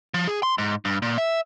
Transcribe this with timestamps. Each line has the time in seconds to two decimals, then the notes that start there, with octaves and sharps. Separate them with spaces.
0.14 F3
0.27 G#4
0.43 C6
0.58 G#2
0.85 G2
1.02 A#2
1.18 E5